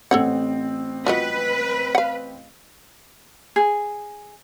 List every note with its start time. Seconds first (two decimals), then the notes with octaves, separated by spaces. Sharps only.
0.11 A1 C4 A4 C#5 F#5
1.06 F4 F#4 B4 D#5
1.95 F5 F#5
3.56 G#4